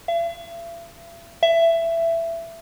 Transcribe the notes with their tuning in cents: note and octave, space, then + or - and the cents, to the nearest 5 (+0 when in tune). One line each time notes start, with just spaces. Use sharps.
E5 +45
E5 +15